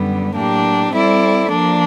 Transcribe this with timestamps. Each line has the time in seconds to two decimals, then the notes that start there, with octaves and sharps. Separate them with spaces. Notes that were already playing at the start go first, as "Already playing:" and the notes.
Already playing: F#2 D3 G3 B3
0.35 A2 F#3 A#3 D4 G4
0.93 G3 C4 E4 A4 D5
1.51 F3 A#3 D4